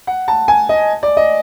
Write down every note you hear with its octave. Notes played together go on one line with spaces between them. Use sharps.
F#5
A5
G#5
D#5
D5
D#5